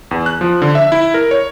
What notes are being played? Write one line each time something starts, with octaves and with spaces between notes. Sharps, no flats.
E2
F#6
F3
D3
E5
E4
A#4
C#5